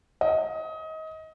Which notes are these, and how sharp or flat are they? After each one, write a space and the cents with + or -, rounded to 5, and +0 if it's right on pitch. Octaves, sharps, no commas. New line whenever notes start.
D#5 +25